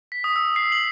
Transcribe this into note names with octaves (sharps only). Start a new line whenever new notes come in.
B6
D#6
E6
C7
F#7